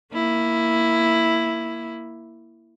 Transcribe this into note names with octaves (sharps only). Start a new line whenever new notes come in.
A#3 E4